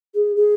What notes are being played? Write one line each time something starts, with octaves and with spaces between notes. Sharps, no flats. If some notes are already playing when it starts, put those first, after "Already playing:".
G#4
G#4